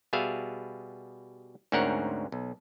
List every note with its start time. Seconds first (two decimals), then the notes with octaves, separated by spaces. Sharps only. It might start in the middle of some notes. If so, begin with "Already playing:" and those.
0.13 B2 G3 B3 G#4 E5 F5
1.72 D2 G#2 C4 C#4 A#4 F#5
2.32 B1